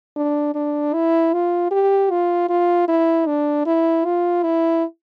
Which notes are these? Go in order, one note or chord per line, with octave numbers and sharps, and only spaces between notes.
D4
D4
E4
F4
G4
F4
F4
E4
D4
E4
F4
E4